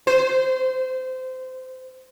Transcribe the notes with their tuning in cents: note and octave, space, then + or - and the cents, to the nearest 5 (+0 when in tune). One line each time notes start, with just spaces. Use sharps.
C5 -20